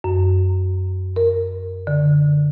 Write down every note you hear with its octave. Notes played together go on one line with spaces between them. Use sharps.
F#2
A#4
D3